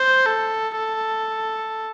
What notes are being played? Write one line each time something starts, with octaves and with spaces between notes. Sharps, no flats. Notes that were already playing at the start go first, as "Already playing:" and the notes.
Already playing: C5
A4
A4